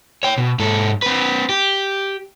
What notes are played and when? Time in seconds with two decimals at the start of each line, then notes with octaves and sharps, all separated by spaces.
0.23 C#5 G5
0.38 B2
0.59 G#2 A4
1.02 C4 B4
1.49 G4